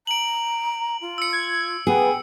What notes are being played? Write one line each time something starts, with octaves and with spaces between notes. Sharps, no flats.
A#5 D7 F#7
F4
E6 C#7
G#6
B3 G#4 G5